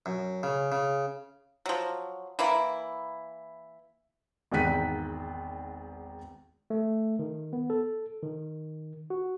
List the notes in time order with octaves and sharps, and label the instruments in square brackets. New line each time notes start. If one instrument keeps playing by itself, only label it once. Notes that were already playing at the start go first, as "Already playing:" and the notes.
[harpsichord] F#2
C#3
C#3
[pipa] F3 F#3
E3 A#3 E4
[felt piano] G#1 E2 D#3 F#6 B6 D#7
[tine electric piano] A3
D#3
B3
A4
D#3
F#4